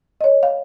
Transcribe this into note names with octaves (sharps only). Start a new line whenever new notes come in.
D#5
C#5
F5